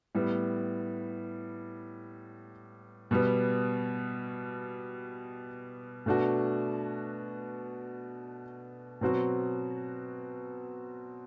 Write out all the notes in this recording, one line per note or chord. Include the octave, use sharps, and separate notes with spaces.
A2 G3 B3
B2 G3 B3
B2 A3 D4 F#4
B2 F#3 C4 F#4